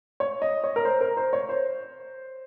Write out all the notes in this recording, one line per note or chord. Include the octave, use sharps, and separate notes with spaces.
C#5
D#5
C#5
A#4
C5
A#4
C5
C#5
C5